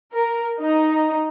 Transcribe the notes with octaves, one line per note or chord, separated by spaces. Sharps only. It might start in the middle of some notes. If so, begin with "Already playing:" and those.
A#4
D#4